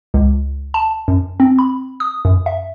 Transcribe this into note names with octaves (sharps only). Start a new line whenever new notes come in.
C#2
A5
F#2
C4
B5
D#6
F#2
E5